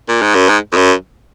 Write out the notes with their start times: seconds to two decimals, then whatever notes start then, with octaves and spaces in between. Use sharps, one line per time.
0.09 A#2
0.22 G#2
0.35 F#2
0.49 G#2
0.73 F2
0.77 F#2